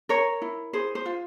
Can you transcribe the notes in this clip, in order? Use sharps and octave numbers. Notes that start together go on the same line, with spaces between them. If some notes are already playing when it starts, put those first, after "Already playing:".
A#4 C#5
E4
G#4 C5
C5
F4